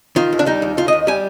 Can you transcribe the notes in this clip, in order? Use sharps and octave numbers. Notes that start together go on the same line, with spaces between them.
D#3 F4
D#2
D4
G3 D#4
D#2
D#3 F4
D#2 D#5
G3 G#5